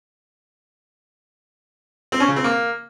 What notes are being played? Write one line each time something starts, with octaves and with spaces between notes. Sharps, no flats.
C4
C#4
C#3
C4
A#3